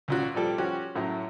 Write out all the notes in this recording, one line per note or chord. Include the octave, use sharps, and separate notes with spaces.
C#2 A#2 F#4
A#2 F3 G3 A4
F3 C#4 F#4 G4
F#2 A2 F#3 E4